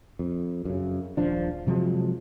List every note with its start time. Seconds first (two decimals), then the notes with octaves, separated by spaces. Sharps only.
0.19 F2
0.65 F#2 C#3
1.17 D#1 A#1 F3 D4
1.67 C3 F3 F#3 G#3